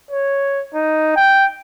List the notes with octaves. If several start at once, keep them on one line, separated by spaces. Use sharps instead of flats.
C#5
D#4
G5